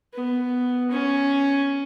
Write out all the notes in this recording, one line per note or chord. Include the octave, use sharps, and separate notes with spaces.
B3
C#4